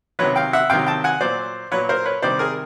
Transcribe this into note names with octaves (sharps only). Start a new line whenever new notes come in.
C3 D#3 F#3 B4 C#5
F5 G5
E5 F#5
C3 D#3 F#3 F5 G5
G5 A5
F#5 G#5
A#2 F#3 C5 D5
A#2 F#3 B4 C#5
A#4 C5
B4 C#5
C3 D#3 G3 C5 D5
G#4 A#4